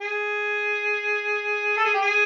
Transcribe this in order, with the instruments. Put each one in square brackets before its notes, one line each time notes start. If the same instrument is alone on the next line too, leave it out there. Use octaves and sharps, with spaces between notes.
[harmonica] G#4
A4
G#4
G4
G#4